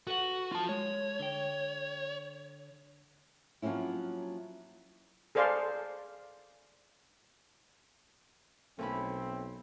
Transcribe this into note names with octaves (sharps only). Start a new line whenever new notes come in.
F#4 A4 B4 F#5
F4 A5
G#3 C#5
D3 G5
F3 F#3 A#3 C4 C#4 E4
G#4 A4 C5 D5 F5 C6
B1 A3 A#3 C4 C#4 E4 B5